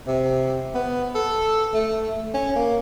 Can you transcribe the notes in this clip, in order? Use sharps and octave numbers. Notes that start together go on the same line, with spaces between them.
C3
B3
A4
A3
C#4
A#3